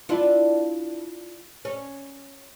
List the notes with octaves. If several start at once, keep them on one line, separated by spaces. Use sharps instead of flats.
D4 E4 F4
C#4